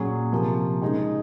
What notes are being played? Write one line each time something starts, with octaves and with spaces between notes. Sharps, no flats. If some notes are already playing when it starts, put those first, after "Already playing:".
Already playing: A#2 F#3 C#4 G#4
C3 F3 A#3
C#3 G#3 D#4 G#4